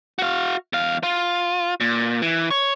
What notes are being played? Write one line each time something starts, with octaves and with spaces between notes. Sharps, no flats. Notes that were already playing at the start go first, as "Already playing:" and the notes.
F#4 F5
E2 F5
F4
A#2
E3
C#5